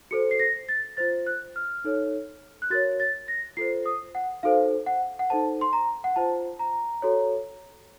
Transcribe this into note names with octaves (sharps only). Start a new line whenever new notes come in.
F#4 A4 C5 C#7
C7
A#6
A6
F4 C5 A6
F#6
F6
D#4 A4 C#5
F#6
F#4 A#4 C#5 A6
A6
A#6
F4 A4 C5 C7
D#6
F#5
D#4 F#4 A4 C5 F5
F#5
F#5
D#4 A4 C5 A5
C6
A#5
F#5
F4 C5 A5
A#5
F#4 A4 C#5